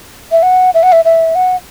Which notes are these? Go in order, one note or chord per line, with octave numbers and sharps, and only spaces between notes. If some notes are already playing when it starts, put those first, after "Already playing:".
E5
F#5
E5
F#5
E5
E5
F#5